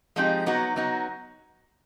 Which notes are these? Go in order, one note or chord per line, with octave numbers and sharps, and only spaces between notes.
F3 G#3 C4 D#4 G4
F#3 B3 D#4 F#4
F#3 B3 D#4 F#4